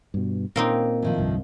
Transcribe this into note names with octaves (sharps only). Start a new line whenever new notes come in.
G2 B2
A#2 A#3 C4 C#4 D#4
A2 D#3 F3
C2 G2